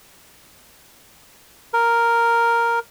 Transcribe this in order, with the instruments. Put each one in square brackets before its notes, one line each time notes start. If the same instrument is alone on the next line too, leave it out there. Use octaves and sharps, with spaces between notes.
[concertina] A#4